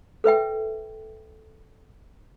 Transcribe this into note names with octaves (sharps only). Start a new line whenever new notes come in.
A4 B4 E5 G5